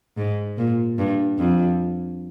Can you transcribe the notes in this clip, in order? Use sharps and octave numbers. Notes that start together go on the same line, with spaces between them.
G#2
A#2
G2
F2